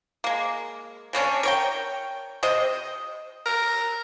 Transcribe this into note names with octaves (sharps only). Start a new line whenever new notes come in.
G#3 A#3
C3 A#3 C#4 D4
A#4 C#5 G5
C3 C5 D#5
A#4